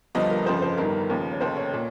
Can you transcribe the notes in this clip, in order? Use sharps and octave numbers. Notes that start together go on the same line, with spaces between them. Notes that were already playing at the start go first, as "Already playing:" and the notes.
G1 G2 F3 D#5
A#4
G1 F2 C#3 F3 C5
C5
G1 G2 D#3 A#4
D#2 C#3 F3
C#5
F1 D#2 C#3 C5
C#5
A#2